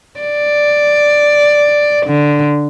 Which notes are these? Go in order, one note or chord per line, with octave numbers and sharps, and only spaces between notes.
D5
D3